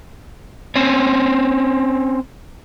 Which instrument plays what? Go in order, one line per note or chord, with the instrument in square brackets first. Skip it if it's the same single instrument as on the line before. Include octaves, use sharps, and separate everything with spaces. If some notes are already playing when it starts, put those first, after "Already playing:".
[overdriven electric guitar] C4 C#4